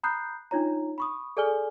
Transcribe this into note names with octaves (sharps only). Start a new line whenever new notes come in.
A#5 B5 D#6 F#6 G6 C7
D4 D#4 F4 C#5 A#5
B5 C#6 D#6
G#4 A4 D5 G#5 F6 G7